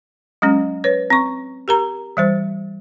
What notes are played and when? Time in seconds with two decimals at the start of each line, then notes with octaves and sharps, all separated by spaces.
0.42 F#3 G#3 C#4
0.84 B4 C#5
1.10 C4 C#6
1.68 G4 A#4 A#5
2.17 E3 G3 C5